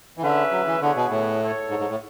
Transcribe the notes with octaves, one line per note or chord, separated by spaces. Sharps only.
E3
D3 C#4 G#4 B4 E5
F#3
E3
D3 B3 E4 G#4 C#5 F#5
B2
A2
A3 E4 A4 C#5
G#2
G#2
A2